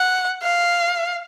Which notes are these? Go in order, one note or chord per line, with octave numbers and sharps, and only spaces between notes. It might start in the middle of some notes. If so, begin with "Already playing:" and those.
Already playing: F#5
F5